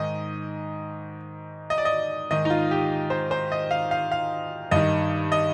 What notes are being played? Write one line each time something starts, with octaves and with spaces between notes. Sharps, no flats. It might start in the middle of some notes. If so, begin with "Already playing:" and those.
Already playing: G#2 D#3 D#5
D#5
D5
D#5
G#2 D#3 D#5
D#4
F4
G4
C5
C5
D#5
F5
F5
F5
G2 D#3 D#5
D#5